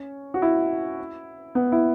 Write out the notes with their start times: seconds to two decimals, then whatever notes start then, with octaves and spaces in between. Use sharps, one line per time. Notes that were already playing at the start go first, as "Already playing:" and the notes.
Already playing: C#4
0.34 F#4
0.42 E4
1.55 B3
1.72 E4